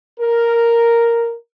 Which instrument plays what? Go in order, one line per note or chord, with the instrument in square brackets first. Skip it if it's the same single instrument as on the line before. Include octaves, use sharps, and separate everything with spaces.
[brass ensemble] A#4